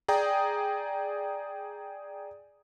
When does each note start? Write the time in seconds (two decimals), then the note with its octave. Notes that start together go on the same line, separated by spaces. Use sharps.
0.08 G#4 D5 G5 A#5 D#6